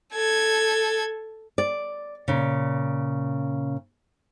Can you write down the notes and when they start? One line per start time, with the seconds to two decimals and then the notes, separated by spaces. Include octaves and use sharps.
0.13 A4 G#6
1.58 D5
2.28 A#2 C#3